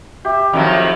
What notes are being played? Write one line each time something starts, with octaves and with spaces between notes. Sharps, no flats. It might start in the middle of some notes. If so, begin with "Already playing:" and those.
G4 E5
F2 D#3 F#3 E4 E5